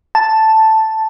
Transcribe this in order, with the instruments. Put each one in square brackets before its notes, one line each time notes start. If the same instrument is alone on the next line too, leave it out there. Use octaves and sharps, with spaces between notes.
[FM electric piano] A5